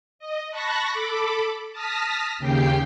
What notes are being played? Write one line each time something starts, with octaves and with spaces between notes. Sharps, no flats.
D#5
A5 B5 C#6 F#6 A#6
A4 B5 D6
A5 D#6 F6 A#6 B6
D#2 C#3 G4 G5 C7